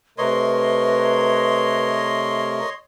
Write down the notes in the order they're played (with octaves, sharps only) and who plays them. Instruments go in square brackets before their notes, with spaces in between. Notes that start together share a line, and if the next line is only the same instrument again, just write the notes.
[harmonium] C3 A3 A#4 [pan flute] B4 [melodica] C#5 D#5 C6